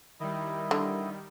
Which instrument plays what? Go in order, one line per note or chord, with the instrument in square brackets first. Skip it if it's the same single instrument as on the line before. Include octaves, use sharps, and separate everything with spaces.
[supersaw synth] D#3 G3 [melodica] E4 D#5
[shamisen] D3